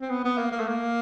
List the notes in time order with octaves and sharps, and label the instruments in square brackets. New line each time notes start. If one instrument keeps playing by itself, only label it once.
[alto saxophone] C4
B3
B3
A#3
A#3
A3
A#3